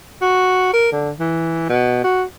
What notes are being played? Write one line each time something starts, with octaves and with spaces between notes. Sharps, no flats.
F#4
A#4
D3
E3
B2
F#4